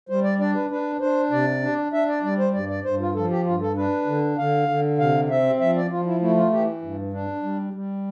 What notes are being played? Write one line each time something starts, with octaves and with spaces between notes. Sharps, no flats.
G3 C5
D5
D4 D5
B4
D4 B4
D4 C5
C3 D5
D4
D4 E5
D5
G3 D5
C5
G2 D5
D5
G2 C5
F4
F3 A4
G4
G2 F4
A4
D4 B4
D3
D3 F5
D3
C3 F5
C4 E5
F3 E5
D5
F3 F4
E4
A3 E4
F4
E3 G4
G2
D4
G3
G3